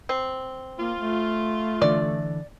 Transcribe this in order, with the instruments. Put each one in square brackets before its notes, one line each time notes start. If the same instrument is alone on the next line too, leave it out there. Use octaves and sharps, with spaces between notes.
[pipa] C4
[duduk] A#3 [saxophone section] F4
[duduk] A3
[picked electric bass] D3 E3 D4 [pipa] D5